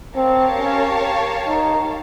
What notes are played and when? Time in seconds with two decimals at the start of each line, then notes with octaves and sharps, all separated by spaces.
0.15 C4 G4 A#4 C#5 F5 A5
0.59 C#4
1.47 D#4